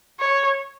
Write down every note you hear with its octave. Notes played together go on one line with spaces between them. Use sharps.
C#5